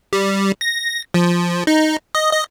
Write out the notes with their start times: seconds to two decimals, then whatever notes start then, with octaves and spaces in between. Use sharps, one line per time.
0.13 G3
0.61 A#6
1.14 F3
1.67 D#4
2.15 D#5
2.32 D#5